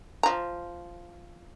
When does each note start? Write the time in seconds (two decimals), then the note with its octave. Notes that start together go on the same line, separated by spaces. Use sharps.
0.23 F3 A#5